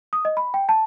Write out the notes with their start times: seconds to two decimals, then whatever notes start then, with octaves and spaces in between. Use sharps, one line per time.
0.13 D#6
0.25 D#5
0.37 B5
0.54 G5
0.69 A5